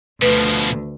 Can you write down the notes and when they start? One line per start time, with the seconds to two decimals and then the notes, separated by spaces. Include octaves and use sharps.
0.22 D2 B2 F3 B4